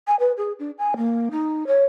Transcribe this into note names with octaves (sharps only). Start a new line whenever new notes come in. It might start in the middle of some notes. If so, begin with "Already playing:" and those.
G#5
B4
G#4
D4
G#5
A#3
D#4
C#5